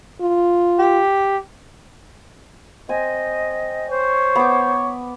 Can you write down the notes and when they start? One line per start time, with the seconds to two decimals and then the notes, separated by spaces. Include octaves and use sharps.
0.21 F4
0.79 G4
2.89 C4 D#5 G#5
3.90 C5 C#5
4.35 B3 D6